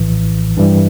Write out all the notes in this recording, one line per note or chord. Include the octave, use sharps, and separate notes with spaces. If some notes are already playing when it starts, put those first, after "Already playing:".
Already playing: A#1 A2 E3
G2 E3 G3